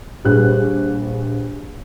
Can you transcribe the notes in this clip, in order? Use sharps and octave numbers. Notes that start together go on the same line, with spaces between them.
A#1 G3 G#4 B4 F#6